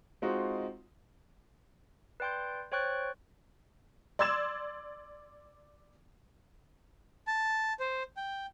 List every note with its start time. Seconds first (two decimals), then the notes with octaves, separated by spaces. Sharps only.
0.22 G#3 C4 D#4 F4 F#4
2.20 B4 D5 G5 C6 G6
2.72 C5 C#5 G5 C#6 F#6 A6
4.19 D5 C6 E6 G#6 A6 E7
7.27 A5
7.80 C5
8.17 G5